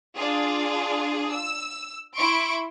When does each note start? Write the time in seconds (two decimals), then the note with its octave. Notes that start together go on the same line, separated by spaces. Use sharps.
0.16 D4 F4 G#4
1.32 E6
2.16 E4 E5 C6 C#6 D7